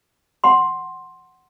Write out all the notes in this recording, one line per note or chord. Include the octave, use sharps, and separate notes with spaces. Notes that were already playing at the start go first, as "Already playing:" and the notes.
F#5 C6